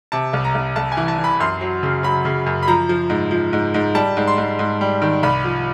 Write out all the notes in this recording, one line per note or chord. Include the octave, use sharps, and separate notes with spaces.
C3 A5
C2
A#5
C2
C2 A5
G#5
E3
A5
E3
B5
F#2 C6
F#3
C#3
F#3 B5
C#3
F#2
B5
F3 A#5
F3
G#2
F3
G#2
G#2
G3 A5
G#2
C6
G#2
G#2
G3
D#3
C2 B5
F3